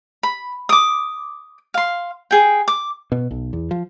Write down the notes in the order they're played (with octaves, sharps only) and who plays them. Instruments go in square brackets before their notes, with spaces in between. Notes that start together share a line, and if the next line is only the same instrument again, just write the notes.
[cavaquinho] B5
D6 D#6
F5 C6
G#4 G5
D6
[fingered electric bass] B2
B1
E2
F3